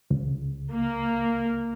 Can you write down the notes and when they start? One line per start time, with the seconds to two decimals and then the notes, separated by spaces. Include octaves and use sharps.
0.11 C#2
0.72 A#3